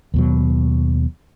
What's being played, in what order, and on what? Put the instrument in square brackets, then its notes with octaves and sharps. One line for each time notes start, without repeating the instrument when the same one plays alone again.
[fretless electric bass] D#2 B2 F#3